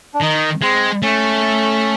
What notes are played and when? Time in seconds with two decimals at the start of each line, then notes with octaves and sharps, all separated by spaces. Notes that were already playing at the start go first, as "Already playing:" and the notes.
0.14 D4
0.22 D#3 D#4
0.62 G#3 C4
1.02 A3 C#4